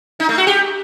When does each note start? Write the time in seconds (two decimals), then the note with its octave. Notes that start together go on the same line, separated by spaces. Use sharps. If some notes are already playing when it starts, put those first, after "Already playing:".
0.20 D#4
0.29 A3
0.38 F#4
0.47 G4